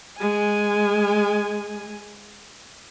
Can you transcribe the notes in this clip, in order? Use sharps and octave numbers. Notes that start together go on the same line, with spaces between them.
G#3 G#5